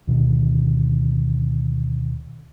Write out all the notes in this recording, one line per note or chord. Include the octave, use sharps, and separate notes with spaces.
D2 B2 D#3